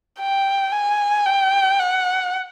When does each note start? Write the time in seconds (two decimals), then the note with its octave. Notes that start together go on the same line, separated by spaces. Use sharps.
0.19 G5
0.72 G#5
1.26 G5
1.79 F#5